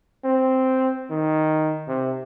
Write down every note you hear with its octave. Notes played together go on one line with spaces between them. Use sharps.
C4
D#3
C3